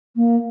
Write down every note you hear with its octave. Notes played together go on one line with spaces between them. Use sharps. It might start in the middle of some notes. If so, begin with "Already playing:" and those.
A#3